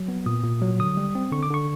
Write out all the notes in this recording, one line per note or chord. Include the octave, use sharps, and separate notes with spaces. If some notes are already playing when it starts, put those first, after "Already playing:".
Already playing: F#3
B3
A#2 D#6
A#2
F#3
D3 D#6
G3
C4
D3 C#6
D6
D3 C#6